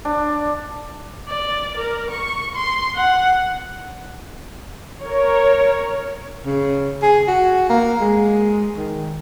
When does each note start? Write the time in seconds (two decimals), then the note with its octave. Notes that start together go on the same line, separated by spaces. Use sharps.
0.05 D4
1.28 D5
1.77 A#4
2.10 C#6
2.55 C6
2.95 F#5
5.03 A#4 C#5
6.46 C#3
7.02 G#4
7.28 F#4
7.69 A#3
8.01 G#3
8.77 D#3